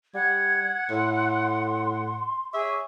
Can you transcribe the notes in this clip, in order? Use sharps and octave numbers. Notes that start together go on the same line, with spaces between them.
G3 F#5 G#6
A2 C6
G#4 C#5 E5 C#6 D6